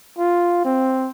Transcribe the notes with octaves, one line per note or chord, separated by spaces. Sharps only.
F4
C4